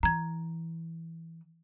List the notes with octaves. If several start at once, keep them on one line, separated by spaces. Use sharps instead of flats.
E3 A#5 G#6